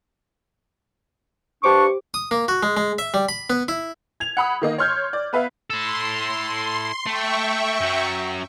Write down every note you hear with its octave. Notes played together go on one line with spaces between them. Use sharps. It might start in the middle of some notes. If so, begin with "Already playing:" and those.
G2 D4 G4 C5 C#6 D6
D#6
A#3
F#4
G#3
G#3
E5
G3
B5
B3
E4
G#6 F7
F#5 B5 D#6
D#3 A#3 D#5
C#5 C6 F6 G6 G#6
D5
B3 B4 E5 F5
E4 A4 C6
A3 E5 G5 C#6
F#2 F#3